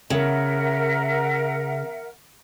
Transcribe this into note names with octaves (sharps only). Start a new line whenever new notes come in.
C#3 A#4 E5 F#5